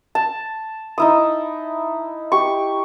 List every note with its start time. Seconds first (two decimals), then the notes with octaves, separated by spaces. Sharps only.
0.15 A5
0.98 D#4 E4 D#6
2.32 G4 C#6